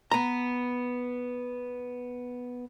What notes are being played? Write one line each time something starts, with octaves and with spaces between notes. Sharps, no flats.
B3 A#5